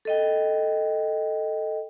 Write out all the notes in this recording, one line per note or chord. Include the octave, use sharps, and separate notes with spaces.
A4 D#5 G5